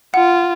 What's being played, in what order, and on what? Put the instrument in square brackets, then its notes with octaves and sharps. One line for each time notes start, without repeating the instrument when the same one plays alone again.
[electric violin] F4 [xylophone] F#5